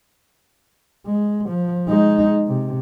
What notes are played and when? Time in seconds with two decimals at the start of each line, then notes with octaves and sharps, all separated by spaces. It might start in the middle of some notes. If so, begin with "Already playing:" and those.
1.06 G#3
1.49 F3
1.88 G#3 D#4
2.47 C3